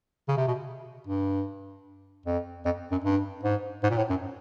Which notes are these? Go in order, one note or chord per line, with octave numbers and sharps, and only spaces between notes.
C#3
C3
B2
G2
F2
F2
F#2
G2
G#2
G#2
A#2
A2
F#2